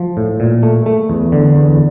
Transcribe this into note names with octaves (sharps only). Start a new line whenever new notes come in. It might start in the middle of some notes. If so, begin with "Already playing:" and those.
Already playing: F3
A2
A#2
A3
A3
E2
D3
E2